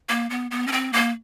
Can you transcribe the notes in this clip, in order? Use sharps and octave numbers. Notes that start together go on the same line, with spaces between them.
A#3
B3
B3
C#4
C4
A#3